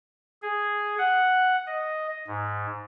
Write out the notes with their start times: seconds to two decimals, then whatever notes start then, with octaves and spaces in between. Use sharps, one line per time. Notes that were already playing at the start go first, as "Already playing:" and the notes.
0.42 G#4
0.98 F#5
1.67 D#5
2.27 G#2